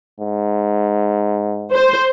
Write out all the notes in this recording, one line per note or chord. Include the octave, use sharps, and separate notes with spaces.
G#2
C5